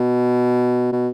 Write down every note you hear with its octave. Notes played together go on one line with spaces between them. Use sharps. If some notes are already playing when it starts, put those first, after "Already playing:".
Already playing: B2
B2